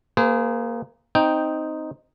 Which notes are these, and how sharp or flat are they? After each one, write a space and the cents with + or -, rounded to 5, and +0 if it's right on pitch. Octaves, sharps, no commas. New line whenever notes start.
A#3 +0 G#4 +0 C5 -45
C4 +0 D#4 +0 G5 +0